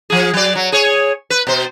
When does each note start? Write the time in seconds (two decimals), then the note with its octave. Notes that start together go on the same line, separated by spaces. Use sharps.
0.10 F3 G#4
0.33 F#3 D5
0.55 F#3
0.72 G#4 C#5
1.30 B4
1.47 B2 C5